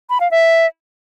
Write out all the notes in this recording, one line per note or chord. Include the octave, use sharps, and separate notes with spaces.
B5
F5
E5